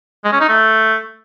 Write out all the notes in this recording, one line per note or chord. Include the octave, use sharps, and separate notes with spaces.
G#3
C#4
D#4
A3